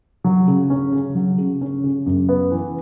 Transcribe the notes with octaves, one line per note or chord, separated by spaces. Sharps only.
F#3
C#3
C#4
C#3
F#3
C#3
C#4
C#3
F#2
B3
E3